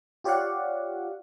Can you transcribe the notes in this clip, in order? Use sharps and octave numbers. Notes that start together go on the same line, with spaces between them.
F4 G4 C#5 D5 F5 F#5